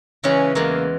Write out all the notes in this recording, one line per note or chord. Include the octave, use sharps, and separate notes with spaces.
C#3 E3 G#3 C#4
E2 E3 G#3 A#3